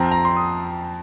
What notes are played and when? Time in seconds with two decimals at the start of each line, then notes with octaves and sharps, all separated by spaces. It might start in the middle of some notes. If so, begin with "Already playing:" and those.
Already playing: F2 F3 C4 A#5
0.11 A#5
0.25 C6
0.37 D#6